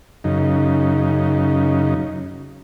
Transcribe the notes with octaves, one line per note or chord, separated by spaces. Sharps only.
F#2 C#3 D#4